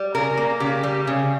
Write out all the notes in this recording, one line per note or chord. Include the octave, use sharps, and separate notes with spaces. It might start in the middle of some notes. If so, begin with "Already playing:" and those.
Already playing: G3
C#3 A#4
A#3
C#3 G4
G3
C#3